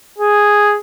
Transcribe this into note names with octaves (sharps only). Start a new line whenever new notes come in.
G#4